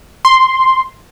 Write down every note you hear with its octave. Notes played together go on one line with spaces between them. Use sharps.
C6